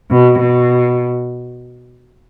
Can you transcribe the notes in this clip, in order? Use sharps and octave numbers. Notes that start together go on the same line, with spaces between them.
B2
B2